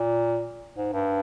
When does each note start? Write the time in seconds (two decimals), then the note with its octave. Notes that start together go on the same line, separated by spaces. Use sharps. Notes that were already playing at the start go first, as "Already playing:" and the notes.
Already playing: A#2
0.77 G#2
0.93 G2